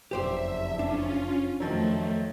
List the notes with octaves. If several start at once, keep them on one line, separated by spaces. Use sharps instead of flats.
F#1 F2 G4 C5 D5 E5
C#4 D4 F4
F2 D#3 F3 F#3 A3